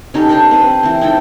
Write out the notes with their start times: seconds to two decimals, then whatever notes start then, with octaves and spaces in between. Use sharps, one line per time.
0.14 C#4 D#4 G4 A4
0.29 D4 C5 D5 G5
0.51 C4 B4
0.83 E3 C4
1.01 C4 D#4 A4 G5